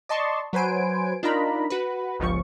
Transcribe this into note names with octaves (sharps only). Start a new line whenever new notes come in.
D5 D#5 A5 C6 C#6
F#3 B4 C5 G#5 D7
D4 D#4 F4 A#4 A#5 B5
F#4 B4
G1 C#2 F3 C#6